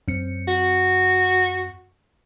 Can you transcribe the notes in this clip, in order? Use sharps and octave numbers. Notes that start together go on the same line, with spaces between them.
F#2 C4 C#7
F#4